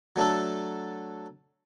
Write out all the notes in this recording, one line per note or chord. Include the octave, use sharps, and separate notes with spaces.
F#3 A3 D4 A4